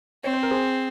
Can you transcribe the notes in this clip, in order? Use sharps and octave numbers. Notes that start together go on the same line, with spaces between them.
C4 C#5
C5
A#4
G#4 C5